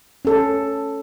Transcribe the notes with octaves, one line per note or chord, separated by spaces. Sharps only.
C#4 A4